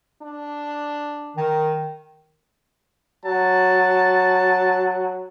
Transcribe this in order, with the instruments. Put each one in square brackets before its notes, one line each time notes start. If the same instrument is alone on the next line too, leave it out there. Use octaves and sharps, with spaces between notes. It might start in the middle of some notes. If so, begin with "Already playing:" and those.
[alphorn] D4
[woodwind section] D#3
[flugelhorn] F#3 [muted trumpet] A5